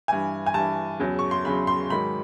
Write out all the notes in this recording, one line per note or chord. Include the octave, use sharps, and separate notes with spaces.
G2 E3 G#5
G#5
G2 E3 A5
E2 C#3 F#3
C#6
C6
E2 C#3 F#3 B5
C6
G#2 D#3 F#3 B5